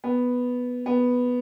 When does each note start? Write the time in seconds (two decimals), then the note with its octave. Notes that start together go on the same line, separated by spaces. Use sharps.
0.04 B3
0.86 B3